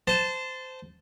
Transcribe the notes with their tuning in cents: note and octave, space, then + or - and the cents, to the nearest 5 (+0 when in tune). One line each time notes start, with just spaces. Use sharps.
C5 -20 A5 +0